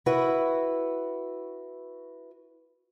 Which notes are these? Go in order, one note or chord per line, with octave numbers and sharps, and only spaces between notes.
E4 F#4 B4